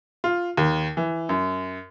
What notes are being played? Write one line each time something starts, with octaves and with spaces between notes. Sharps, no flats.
F4
D#2
E3
F#2